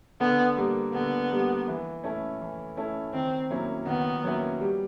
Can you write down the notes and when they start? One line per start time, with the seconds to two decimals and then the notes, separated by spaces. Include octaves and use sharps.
0.20 D3 B3
0.57 G3 A#3
0.94 D3 B3
1.31 G3 A#3
1.68 E3
2.03 A3 C#4 E4 A4
2.41 E3
2.77 A3 C#4 E4 A4
3.14 D#3 C4
3.50 F#3 A#3 C#4 E4
3.87 D#3 B3
4.24 F#3 A#3 C#4 E4
4.60 G3